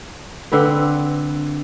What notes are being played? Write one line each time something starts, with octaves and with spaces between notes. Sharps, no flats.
D3 C4 B4